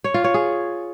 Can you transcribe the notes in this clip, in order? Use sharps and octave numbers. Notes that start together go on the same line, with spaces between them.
C#5
F4
C#5
G#4